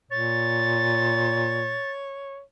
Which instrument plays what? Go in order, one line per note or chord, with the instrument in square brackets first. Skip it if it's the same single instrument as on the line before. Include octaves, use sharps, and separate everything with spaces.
[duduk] A#2 [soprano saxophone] C#5 [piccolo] A6